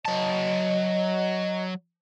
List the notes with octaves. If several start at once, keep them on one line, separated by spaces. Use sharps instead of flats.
F#3 D#5 A5